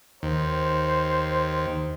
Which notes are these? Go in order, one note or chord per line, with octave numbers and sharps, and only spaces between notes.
D#2 C5